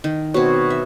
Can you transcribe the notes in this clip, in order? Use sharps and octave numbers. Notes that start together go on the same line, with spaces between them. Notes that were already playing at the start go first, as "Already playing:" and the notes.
D#3
B2 C4 F#4 C#5
E5